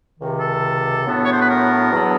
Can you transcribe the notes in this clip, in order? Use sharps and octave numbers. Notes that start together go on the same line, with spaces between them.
C#2 C3 D#3
A4
A2 F#3 B3 D4
C#5
C5
B4
A#4
E2 B2 F#3 B3 D4